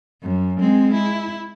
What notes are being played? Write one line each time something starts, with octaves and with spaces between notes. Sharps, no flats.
F#2
G#3 C4
E4